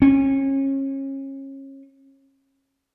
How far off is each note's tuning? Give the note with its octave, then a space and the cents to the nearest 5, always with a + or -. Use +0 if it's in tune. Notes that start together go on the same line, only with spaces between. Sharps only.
C#4 -30